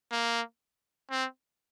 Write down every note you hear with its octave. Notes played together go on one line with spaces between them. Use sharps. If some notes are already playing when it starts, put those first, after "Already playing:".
A#3
C4